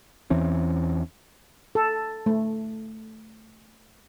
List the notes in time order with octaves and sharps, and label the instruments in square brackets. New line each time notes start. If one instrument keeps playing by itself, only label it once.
[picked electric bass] E2 E3 C4 C#4
[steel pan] A4
A3